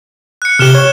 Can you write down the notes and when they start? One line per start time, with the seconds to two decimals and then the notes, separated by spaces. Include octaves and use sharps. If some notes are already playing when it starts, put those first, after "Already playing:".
0.42 F#6 C#7
0.59 C3 G4 F6 E7 G7
0.75 C#5